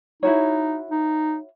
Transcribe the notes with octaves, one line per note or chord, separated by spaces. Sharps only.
D#4 E4 F#4 C#5
D#4